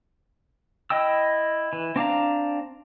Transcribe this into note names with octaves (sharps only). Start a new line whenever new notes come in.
E4 D#5 G5 E6
E3
C4 D4 F5 A#5